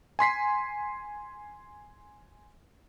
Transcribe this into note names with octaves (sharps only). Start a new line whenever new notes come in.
G#5 C6 B6 C7